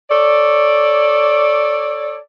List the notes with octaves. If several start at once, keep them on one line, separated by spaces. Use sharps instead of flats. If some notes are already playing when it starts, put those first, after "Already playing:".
A4 C#5 D5